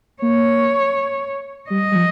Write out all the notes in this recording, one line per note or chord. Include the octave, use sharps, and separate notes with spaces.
A#3 C#5
G3 D#5
G3
F3